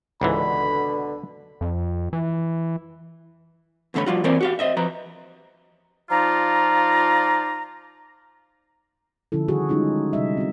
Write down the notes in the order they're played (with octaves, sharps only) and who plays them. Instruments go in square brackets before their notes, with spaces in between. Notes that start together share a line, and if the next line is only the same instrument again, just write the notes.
[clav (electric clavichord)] C#2 G#2 E3 [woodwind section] B2 D3 [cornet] B5
[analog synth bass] F2
E3
[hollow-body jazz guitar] E2 D3 A3 C#4 B5
F3 G3 F4 F#4
E3 A#3 C4 C#4 A#4 D5
F#4 G4 F5
C5 D#5 E5
F3 B4 A#5
[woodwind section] F3 D#4 F4 D5 A#5
[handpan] D3 F3 C#4 E4 A4
D#3 G3 F#4 G#4 A4
G3 G#3 C#4 D#4 F4 G#4
C3 G3 D#5 E5
C4 F#4